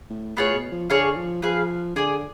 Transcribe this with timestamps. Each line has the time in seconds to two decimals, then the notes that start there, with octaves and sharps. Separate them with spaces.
0.10 A2
0.37 A2 B3 F4 G#4 C#5
0.54 B2
0.72 F3
0.90 D3 D4 G#4 C#5 F5
1.16 F3
1.42 F3 G#4 B4 F5
1.96 D3 G#4 D5 G#5